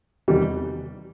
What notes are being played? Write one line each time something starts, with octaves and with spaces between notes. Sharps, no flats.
E2 C3 D#3 G3